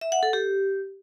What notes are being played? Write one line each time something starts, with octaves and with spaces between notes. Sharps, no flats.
E5
F#5
A4
G4